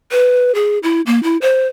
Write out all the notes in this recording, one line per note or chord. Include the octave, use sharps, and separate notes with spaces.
B4
G#4
E4
A#3
E4
C5